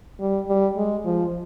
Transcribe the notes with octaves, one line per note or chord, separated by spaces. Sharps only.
G3
G3
G#3
F3